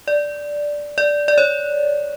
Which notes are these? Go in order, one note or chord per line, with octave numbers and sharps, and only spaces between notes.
D5
D5
D5
C#5